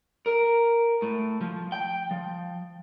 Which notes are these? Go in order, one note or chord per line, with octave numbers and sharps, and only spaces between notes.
A#4
A2
F3
G5
F3